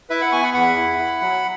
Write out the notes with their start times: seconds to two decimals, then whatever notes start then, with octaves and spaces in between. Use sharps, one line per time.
0.10 E4 B4 E5
0.21 F#5 B5
0.32 B3 G#5 C#6
0.43 F#5 B5
0.54 E2 F#5 B5
0.77 E4
0.98 E4
1.21 F#3